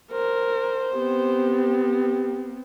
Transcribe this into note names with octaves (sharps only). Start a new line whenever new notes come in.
A#4 C5
B3 C4 G4